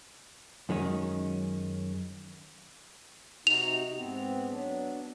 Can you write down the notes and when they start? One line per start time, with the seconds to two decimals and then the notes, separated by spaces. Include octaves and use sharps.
0.69 F#2 D#3 G#3 C#4
3.47 C3 D#4 F#4 F7
3.96 G#2 B3 C4
4.50 F#3 B3 D4